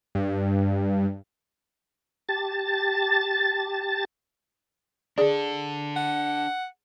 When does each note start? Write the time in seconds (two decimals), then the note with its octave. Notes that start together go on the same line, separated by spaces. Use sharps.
0.15 G2
2.29 G4 A5 A6
5.18 D4 G#4 A4 D5
5.96 F#5